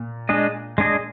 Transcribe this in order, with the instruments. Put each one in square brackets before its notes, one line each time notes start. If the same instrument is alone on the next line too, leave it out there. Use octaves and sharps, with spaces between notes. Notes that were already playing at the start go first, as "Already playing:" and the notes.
Already playing: [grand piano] A#2
[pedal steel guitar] G#3 D4 G#4 D#5
G#3 D4 G#4 D#5